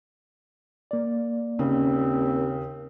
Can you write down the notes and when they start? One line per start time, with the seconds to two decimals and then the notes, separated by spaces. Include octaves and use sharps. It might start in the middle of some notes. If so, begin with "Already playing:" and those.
0.91 A#3 D5
1.59 D#2 C#3 C4